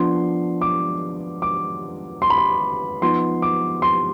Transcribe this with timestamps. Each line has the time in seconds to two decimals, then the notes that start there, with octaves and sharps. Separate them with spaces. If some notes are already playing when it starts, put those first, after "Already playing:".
Already playing: F3 B3 D4 C6
0.61 D6
1.42 D6
2.22 C6
2.30 B5
2.38 C6
3.02 F3 B3 D#4 C6
3.42 D6
3.82 C6